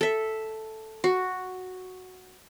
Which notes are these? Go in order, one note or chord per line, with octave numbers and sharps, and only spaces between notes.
A4 E5
F#4